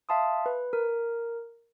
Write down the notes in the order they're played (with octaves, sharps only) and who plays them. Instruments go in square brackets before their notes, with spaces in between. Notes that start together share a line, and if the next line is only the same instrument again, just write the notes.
[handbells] E5 F5 A5 C6 D#6
B4
A#4